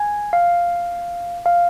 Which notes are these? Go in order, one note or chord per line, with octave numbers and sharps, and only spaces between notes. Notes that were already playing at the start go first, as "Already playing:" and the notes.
Already playing: G#5
F5
F5